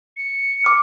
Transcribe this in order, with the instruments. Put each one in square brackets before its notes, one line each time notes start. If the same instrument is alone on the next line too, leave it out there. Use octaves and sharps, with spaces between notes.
[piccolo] C#7
[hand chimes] D6 F6